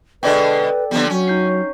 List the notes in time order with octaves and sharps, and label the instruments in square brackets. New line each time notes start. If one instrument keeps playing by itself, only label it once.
[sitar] B2 D3 G#3 [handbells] A4 D5 G5 [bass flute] B4
[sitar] D3 F3 G3 [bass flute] B3
[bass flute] F#3 [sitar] C#4
[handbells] D#4 G6 C7